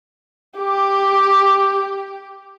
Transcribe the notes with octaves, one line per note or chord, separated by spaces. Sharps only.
G4 D6